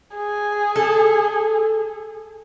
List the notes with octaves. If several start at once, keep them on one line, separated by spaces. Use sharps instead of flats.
G#4
A4